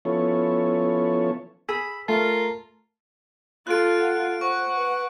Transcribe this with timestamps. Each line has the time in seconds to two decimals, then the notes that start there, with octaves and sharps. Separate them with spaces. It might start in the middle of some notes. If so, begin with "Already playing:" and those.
0.05 F3 B3 C#4 E4 A4 C#5
1.69 G#4 B5 E6
2.08 A3 F4 A#4 A5
3.67 F4 A4 F#6 D7
4.00 F#5
4.41 C5 F#5 C#6
4.76 B4